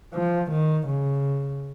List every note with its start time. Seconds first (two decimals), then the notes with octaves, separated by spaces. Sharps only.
0.14 F3
0.51 D#3
0.87 C#3